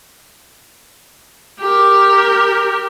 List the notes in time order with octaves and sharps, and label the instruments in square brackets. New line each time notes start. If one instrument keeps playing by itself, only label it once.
[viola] G4 A#4